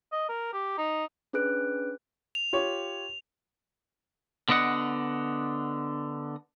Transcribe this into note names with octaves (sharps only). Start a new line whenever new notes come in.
D#5
A#4
G4
D#4
C#4 D4 G#4 B4 F#6 D7
F7
F4 G4 C#5
D3 B3 D4 D#5 F#5